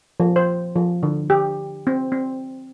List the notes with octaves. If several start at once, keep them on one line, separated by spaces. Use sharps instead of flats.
F3
C5
F3
D3
G4
C4
C4